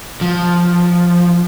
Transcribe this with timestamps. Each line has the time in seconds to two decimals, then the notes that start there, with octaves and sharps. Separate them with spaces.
0.21 F3